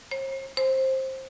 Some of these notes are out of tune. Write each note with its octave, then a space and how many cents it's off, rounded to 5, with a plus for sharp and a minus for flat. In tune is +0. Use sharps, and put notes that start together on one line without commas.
C5 +45
C5 +15